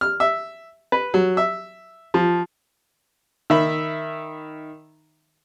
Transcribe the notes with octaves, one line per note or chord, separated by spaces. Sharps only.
F6
E5
B4
F#3
E5
F3
D#3 E5 B5